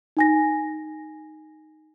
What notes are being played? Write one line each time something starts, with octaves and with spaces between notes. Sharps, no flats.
D#4 G#5 A#6